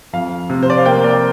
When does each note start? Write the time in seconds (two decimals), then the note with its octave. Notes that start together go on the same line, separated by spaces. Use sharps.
0.13 F2 F5
0.50 C3
0.63 C5
0.70 D5
0.78 F5
0.86 A#3 G5
1.04 D5